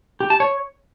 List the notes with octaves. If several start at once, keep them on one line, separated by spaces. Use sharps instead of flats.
G4
A5
C#5